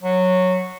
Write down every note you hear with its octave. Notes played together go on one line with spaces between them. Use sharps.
F#3